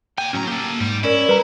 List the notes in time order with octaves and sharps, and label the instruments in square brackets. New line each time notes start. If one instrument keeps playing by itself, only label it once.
[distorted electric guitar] A#2 G#5 [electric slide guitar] G5
[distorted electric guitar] C#2 A#5 [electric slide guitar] A2 F#3 C#4
[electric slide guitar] A#3 [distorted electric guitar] G4 A4
[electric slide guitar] G#2 [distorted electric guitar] G3
[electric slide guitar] C#4 [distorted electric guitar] E4 [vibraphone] A#4 D5
[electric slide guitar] G3 [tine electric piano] B4 A#5